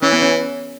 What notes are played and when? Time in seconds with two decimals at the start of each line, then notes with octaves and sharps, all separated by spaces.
0.02 E3 C#4
0.13 B3
0.22 C#4